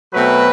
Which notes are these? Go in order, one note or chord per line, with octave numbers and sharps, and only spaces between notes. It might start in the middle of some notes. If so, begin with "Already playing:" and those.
B2 F#3 A3 C4 B4